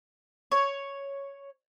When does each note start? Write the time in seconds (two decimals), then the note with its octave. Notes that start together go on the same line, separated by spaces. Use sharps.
0.52 C#5